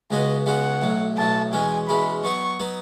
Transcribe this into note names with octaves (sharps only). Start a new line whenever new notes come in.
C#2 C#3 G#3 B3 F#4 D#5
C#2 C#3 G#3 B3 F#4 F#5
B1 A2 F#3
B1 A2 F#3 A5
E2 B2 G#3 C#4 G#5
E2 B2 G#3 C#4 B5
F#3 B3 D#4 C#6
F#3 B3 D#4